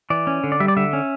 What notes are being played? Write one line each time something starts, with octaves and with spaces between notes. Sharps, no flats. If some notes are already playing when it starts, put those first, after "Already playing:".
E3 D5
C#4
D3
D5
G3 E5
D5
D3 E5
C#4